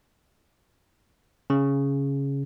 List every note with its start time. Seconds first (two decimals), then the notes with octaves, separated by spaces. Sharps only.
1.50 C#3